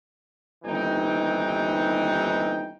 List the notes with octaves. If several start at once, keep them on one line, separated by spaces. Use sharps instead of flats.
G1 D#2 E3 C4 D#4 G5